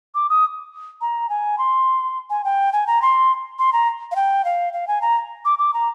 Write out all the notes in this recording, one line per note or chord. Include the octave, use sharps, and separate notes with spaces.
D6
D#6
A#5
G#5
C6
G#5
G5
G#5
A#5
C6
C6
A#5
F5
G5
F5
F5
G#5
A#5
D6
D6
A#5